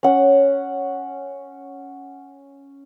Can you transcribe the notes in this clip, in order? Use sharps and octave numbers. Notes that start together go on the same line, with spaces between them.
C#4 F#5